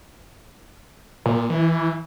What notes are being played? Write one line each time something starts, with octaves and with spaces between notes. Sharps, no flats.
A#2
E3